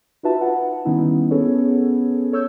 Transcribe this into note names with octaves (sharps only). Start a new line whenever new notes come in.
D#4 F4 F#4 B4 E5 A5
D#4 B4 F#5 A5
D#3 G3 B3 C#4 D#4 E4
B3 C#4 G#4 A4 B4 C#5
A4 C#5 E6 G6